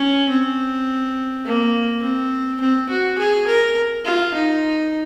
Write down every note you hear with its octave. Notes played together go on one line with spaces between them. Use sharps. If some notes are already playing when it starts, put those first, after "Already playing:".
Already playing: C#4
C4
A#3
C4
C4
F#4
G#4
A#4
F4
D#4